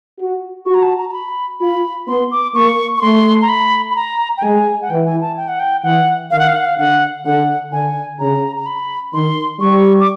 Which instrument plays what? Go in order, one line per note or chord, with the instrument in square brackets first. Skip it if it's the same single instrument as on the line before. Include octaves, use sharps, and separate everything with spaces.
[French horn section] F#4
[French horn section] F#4 [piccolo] C#6
[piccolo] A#5
A5
A#5
A#5
B5
[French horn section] F4 [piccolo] B5
[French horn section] B3 [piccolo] C6
[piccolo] D6
[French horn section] A#3 [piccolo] C#6
[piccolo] C#6
[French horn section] A3 [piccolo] C6
[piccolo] A#5
B5
B5
A#5
G5
[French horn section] G#3 [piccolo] G#5
[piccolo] F#5
[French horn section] E3 [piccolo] G5
[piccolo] G#5
A5
G5
F#5
G5
[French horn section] E3 [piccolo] F#5
[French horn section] D#3 [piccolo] F5
[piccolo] F#5
F5
F#5
F5
[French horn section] D3 [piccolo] F#5
[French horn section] D3 [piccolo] F#5
[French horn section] D3 [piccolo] G#5
[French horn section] C#3 [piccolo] A#5
[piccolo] A#5
B5
[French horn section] D#3 [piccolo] C6
[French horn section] G3 [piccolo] C#6
[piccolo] D6